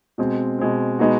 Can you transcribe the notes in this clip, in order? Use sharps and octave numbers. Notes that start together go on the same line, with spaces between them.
B2 G#3 C4
B2 G#3 C4
B2 G#3 B3 D#4 F#4